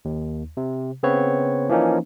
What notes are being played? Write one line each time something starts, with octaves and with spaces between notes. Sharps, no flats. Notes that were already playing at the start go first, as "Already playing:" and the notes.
D#2
C3
C#3 B3 C4 B4 C#5
E3 F3 A#3 C#4 D#4